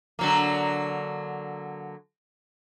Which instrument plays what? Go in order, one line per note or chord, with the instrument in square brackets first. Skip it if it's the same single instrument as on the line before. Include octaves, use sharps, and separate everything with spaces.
[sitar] D3 F#3 A#3